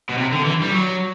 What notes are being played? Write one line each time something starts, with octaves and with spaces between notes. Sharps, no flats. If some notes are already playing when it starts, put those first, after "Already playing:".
B2
C3
D3
E3
G3
F#3